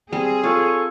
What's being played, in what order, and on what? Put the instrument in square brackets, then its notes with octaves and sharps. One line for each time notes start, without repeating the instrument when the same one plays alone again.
[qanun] G3 C4 [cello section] G#4
[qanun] F4 [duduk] A4 [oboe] C#5